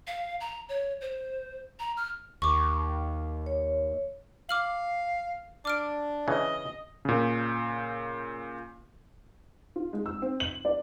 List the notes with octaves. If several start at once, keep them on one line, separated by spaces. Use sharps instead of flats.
F5
A#5
C#5
C5
A#5
F6
D#2 C#6 D6
C#5
F5 D6 F6 F#7
D4 D6 F6 D7
C#3 E3 D#5
A#2 C#3
F4
G#3
E6
C4
F#7
D5